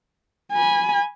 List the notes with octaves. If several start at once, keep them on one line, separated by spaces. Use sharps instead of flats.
G#5 B5